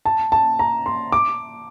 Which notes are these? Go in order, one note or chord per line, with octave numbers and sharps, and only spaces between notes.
A5
A5
A#5
C6
D6